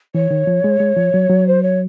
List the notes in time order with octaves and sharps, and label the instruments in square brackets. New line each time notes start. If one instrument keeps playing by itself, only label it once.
[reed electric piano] E3 [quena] C#5
[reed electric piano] D#3
F3
G#3
G#3
F3
F#3
F#3
[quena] C5
C#5